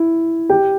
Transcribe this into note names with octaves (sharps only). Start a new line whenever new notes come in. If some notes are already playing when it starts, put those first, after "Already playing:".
Already playing: E4
G4 G5